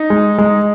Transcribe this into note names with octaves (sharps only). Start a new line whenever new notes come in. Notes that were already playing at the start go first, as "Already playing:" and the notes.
Already playing: D#4
G#3
G#3